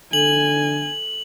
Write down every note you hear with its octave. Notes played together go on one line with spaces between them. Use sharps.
D3 A4 G#5 F#7